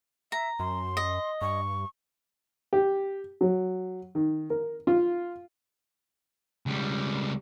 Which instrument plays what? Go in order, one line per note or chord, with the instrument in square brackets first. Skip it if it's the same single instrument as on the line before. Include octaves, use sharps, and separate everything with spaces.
[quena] E5 [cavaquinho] A#5
[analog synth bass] F#2 [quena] C6
[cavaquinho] D#5
[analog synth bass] G2 [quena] C#6
[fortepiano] G4
F#3
D#3
A#4
F4
[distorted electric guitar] C#2 G3